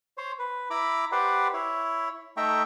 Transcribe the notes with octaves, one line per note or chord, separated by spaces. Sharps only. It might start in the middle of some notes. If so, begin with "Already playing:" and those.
C5 C#5
B4
E4 A#5 B5 D6
G4 B4 C5 D5 F#5
E4 C#5
A3 D#4 E5 G5 A#5 C#6